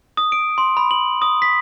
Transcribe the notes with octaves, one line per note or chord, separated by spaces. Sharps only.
D#6
D7
C6
B5
F#7
D#6
B6